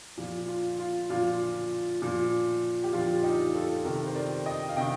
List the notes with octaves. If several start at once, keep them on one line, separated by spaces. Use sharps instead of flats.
A#2 F3
F4
F4
A#2 F3 F4
A#2 F3
G4
A#2 F3 F4
D#4 G4
F4 A4
A4
C3 D#3 G4 A#4
C5
A#4 D5
D#5 G5
F5
C3 D#3 D#5 G5